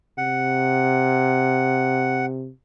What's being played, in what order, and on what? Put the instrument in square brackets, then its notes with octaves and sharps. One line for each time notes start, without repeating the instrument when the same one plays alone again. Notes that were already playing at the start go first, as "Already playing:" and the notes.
[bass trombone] C3 [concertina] F#5